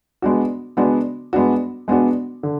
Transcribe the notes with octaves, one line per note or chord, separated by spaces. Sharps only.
G#3 B3 D4 F#4
G#3 B3 D4 F#4
G#3 B3 D4 F#4
G#3 B3 D4 F#4
D3